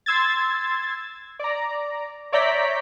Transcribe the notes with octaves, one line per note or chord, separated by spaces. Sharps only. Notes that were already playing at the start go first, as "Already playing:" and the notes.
C6 E6 G#6 A6
D5 A#5
C#5 D5 E5 A#5 G6 B6